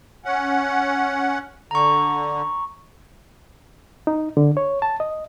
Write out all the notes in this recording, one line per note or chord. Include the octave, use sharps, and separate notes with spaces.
C#4 F#5
D3 A#5 C#6
D#4
D3
C#5
A5
D#5